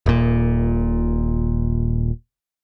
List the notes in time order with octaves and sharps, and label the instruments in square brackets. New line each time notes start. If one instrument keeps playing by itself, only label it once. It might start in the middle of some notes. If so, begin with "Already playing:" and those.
[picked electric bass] D#1 A#2